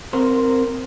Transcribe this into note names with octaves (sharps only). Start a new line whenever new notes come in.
C4 A#4 C5